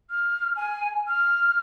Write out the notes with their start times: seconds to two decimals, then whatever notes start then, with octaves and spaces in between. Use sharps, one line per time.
0.10 F6
0.56 G#5
1.08 F6